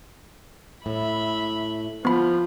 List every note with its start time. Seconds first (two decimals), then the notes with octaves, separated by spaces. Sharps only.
0.86 A2 E5 B5
2.05 F3 B3 B5